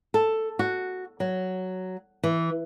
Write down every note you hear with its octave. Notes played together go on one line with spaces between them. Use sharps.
A4
F#4
F#3
E3